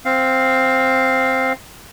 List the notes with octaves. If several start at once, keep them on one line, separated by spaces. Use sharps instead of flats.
C4 F5